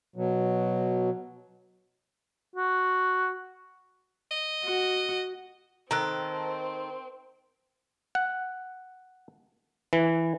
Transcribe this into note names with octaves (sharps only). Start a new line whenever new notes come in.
B2 F#3
F#4
D#5
F#4
D#3 C4 A4 A#5 F#6
F#5
E3